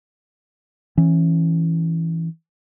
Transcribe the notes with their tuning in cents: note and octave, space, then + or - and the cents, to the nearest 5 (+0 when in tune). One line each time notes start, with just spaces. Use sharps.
E3 -5 C#4 -15